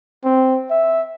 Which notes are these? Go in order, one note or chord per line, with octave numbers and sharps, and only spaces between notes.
C4
E5